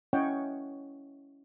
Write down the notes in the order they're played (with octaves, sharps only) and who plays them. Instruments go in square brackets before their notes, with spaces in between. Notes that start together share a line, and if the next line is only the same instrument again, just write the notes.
[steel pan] C#4 E4 C#5 D#5 F#5 G5